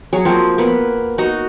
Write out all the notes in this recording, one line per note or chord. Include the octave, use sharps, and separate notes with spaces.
F#3 G#4 C#5
F3 A#3 C4
A#3 B3 B5
D#4 F#4 D#5 A#5